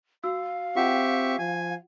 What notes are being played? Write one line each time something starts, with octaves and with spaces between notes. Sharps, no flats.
F#4 F5 E6
C4 F4 G4 E5 F#5 C#6
F3 G#5